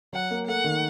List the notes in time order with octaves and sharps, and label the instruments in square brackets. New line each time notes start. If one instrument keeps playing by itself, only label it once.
[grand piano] F#3 [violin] F#5
[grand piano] A#3
[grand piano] A3 [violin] F#5
[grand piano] D#3